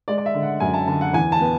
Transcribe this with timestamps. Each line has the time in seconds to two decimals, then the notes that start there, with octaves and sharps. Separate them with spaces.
0.08 G#3 D5
0.18 D5
0.26 E5
0.35 D3
0.43 F#5
0.60 F#2 G#5
0.74 A5
0.88 D3 A5
1.01 F#5
1.13 E2 G#5
1.32 A5
1.40 B3